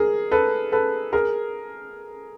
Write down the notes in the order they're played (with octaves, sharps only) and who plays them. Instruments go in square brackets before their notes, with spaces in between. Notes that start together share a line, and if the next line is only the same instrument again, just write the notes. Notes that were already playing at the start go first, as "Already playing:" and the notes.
Already playing: [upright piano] G#4 A#4
A4 B4
A4 B4
G#4 A#4